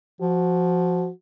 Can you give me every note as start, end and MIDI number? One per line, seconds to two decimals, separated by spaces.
0.21 1.09 53
0.21 1.12 66